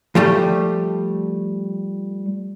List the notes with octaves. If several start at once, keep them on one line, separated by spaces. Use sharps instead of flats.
F3 G3 A3